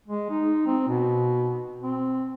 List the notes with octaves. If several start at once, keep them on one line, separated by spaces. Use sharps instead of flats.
G#3
D#4
C4
B2
C4